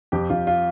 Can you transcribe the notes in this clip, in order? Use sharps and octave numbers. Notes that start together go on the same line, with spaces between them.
F2 G4
F2 F4
F4